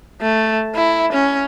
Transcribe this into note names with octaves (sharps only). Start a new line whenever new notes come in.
A3
E4
C#4